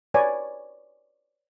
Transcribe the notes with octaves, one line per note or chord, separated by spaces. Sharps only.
B4 C#5 D5 G#5